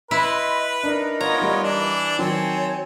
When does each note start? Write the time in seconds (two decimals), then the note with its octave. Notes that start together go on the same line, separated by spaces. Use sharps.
0.11 E4 B4 D#5 C6
0.83 D4 D#4 A#4
1.21 B3 F4 C#5 A#5
1.42 G3
1.63 E3 D4
2.19 D#3 F#3 C4 C#5 G#5 A5